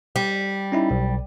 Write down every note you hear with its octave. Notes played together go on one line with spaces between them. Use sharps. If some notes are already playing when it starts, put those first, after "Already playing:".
G3
C#4 D#4 E4
B1